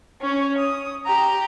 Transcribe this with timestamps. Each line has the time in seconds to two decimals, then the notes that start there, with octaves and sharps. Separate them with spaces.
0.21 C#4 C#5
0.58 D#6
1.06 G4 A#5